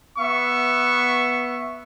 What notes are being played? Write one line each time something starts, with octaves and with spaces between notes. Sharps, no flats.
B3 E5 C#6